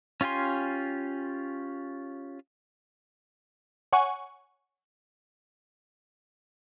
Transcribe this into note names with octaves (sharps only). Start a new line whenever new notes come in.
C#4 F4 G4 G#5 C6
C#5 F#5 G#5 C#6